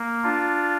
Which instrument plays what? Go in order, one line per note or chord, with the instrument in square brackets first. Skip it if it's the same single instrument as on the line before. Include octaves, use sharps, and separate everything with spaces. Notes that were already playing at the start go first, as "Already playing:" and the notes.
Already playing: [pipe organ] A#3
D4 F4